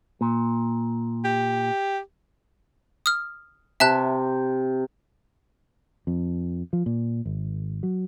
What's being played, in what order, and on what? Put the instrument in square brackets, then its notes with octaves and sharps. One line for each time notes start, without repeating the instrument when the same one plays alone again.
[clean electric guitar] A#2
[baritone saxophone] G4
[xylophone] D#6 F6
[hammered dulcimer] C3 [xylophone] E5 A5 F#6
[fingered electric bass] F2
F3
A#2
G#1
F#3